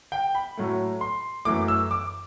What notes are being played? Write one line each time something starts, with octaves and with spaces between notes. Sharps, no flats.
G5
B5
A2 F#3 A3
C6
F#2 E3 A3 D6
E6
D6